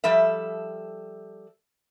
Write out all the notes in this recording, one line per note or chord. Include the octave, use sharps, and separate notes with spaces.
F3 G3 A4 E5